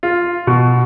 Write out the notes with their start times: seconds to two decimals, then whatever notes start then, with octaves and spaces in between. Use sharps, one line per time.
0.03 F4
0.47 B2